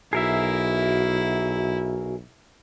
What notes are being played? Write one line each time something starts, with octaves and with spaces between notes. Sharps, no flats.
B1 E4 F#4 G#4 A#4 E5